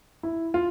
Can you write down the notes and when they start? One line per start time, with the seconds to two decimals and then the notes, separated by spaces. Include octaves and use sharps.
0.23 E4
0.54 F4